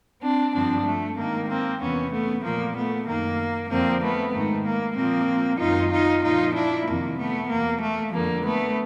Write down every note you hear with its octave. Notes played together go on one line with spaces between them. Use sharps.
C4 D4
G2 D3 F3 C4 D4
A3
G#2 D#3 A#3
A#3 C4
E2 C3 E3 B3 C#4
A3 B3
A#2 F3 A#3
A3 B3
F#2 D#3 A#3
F2 D3 F3 A#3 C4
A3 B3
G#2 D#3 A3
A#3
A#2 F3 A#3 C4
F#2 D#3 D#4 F4
D#4 F4
A#2 F3 D#4 F4
D4 E4
F2 C3 D#3 A#3
A3 B3
E2 B2 A#3
A3
F2 D3 F3 A#3
A3 B3